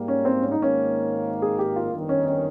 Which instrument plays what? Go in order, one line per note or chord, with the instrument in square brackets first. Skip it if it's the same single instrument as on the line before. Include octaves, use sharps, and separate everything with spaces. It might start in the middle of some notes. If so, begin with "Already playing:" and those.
Already playing: [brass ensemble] G#2 G3 A#3
[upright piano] C#4
C4
C#4
D#4
[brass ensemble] G#1 G#2 D#3 A#3 [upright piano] C#4
[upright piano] G#4
G4
F4
[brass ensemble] G1 F2 D#3
[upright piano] C#4
C#4